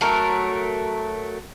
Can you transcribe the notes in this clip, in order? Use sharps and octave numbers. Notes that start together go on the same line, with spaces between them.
F#3 A3 A#4